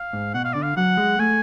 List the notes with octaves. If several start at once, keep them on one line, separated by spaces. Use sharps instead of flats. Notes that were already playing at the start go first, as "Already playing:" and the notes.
Already playing: F5
G#2
B2 F#5
F5
D3 D5
F5
F#3 F#5
G#3
A3 G#5